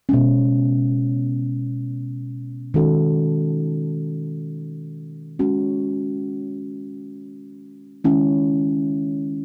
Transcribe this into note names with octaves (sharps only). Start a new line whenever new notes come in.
B2 G#3 C#4
D#3 G#3 C#4 F#4 A4
G#3 C#4 F#4
D#3 G#3 C#4 E4